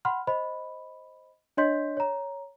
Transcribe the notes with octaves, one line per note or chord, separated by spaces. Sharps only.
F#5 B5 C6 F6
C5 D#5 B5
D4 C#5 D#5 C6 G6 B6
C#5 A#5